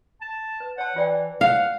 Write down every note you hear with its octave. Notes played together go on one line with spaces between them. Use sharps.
A5
B4
C#5 F#5 A5
E3 F4 D5 G5
F5 F#5